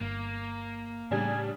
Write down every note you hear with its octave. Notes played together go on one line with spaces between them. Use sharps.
G1 A#3
A2 C#3 G3 D4 G#5